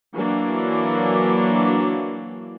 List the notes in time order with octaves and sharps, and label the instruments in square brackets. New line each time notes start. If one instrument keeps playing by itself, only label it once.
[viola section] E3 F#3 A#3 D4 E4